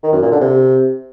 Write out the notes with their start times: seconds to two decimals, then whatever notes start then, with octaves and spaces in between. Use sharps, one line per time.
0.03 D#3
0.13 F#2
0.22 A#2
0.31 D3
0.41 C3